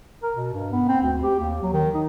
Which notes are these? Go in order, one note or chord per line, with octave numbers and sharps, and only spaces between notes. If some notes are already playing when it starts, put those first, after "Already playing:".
A#4
B2
G2
B3
C4
D2
G4
D#2
F#3
D#3
D#4